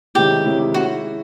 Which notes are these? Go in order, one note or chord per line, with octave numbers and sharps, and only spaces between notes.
C3 D#3 G#3 C#4 E4 G4
C3 D#3 G#3 C#4 E4
G#3 C#4 E4 F#4